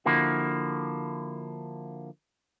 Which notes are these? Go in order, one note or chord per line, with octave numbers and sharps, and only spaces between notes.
D3 F3 A#3 E4 F#4